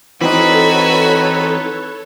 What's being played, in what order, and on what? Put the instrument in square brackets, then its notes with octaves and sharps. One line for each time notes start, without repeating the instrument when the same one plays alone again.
[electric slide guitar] E3 C4 D#4 [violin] F#4 B5 [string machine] A4 C#5 [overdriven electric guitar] B4